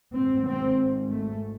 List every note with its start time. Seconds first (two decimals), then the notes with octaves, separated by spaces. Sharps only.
0.13 G#1 G#2 C4
0.46 C4
1.11 A3